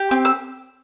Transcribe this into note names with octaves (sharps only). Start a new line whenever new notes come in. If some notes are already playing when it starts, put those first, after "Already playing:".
Already playing: G4
C4
E6